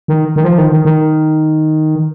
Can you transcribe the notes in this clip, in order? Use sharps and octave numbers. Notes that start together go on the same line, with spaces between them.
D#3
D#3
F3
D#3
D#3
D#3